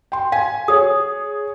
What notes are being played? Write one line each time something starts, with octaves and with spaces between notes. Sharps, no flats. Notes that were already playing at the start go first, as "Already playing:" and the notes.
G5 C6
F5 G#5
G#4 C#5 D#6